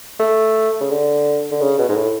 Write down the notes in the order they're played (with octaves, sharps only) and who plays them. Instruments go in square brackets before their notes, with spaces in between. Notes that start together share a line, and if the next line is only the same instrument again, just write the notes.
[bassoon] A3
C#3
D3
D3
C#3
B2
G#2
A2